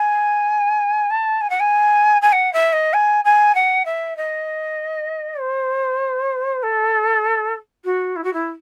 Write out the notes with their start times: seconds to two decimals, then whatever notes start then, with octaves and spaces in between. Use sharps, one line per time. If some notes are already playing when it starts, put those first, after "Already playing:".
Already playing: G#5
1.10 A5
1.41 G#5
1.50 F#5
1.60 G#5
2.22 G#5
2.32 F#5
2.53 E5
2.73 D#5
2.93 G#5
3.25 G#5
3.55 F#5
3.85 E5
4.17 D#5
5.40 C5
6.63 A4
7.85 F#4
8.16 E4
8.24 F#4
8.33 E4